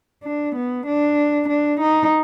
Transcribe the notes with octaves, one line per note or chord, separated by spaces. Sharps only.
D4
B3
D4
D4
D#4